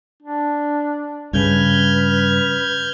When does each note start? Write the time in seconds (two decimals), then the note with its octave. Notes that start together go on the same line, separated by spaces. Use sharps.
0.22 D4
1.33 G2 C#3 B4 F6 G6 G#6